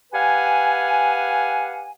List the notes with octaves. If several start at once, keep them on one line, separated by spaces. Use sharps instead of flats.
G4 B4 F5 F#5 G#5